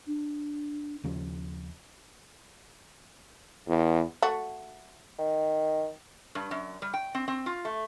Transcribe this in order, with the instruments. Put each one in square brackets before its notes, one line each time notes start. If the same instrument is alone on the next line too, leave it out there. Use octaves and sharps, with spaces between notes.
[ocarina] D4
[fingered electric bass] D#2 C#3 F3 C#4
[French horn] E2
[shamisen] A3 F#4
[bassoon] D#3
[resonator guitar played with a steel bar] G2
F#2
G3
G5
C4
C4
F4
A3